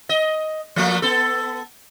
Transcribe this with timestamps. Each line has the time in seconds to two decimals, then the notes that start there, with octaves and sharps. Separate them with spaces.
0.09 D#5
0.76 F3 A3 A#3
1.02 B3 A4